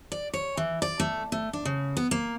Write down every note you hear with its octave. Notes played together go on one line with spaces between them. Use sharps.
D5
C#5
E3
D5
A3
A3
D4
C#3
B3
A#3